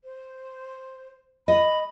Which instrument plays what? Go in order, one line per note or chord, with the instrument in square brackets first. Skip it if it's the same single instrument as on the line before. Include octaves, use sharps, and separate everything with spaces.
[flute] C5
[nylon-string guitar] D#5 [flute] B5